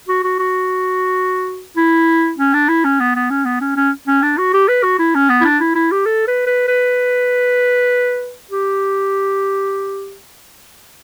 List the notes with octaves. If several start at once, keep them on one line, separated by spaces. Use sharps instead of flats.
F#4
F#4
F#4
E4
C#4
D4
E4
C#4
B3
B3
C#4
B3
C#4
C#4
C#4
D4
F#4
G4
B4
F#4
E4
C#4
B3
E4
D4
E4
E4
G4
A4
B4
B4
B4
G4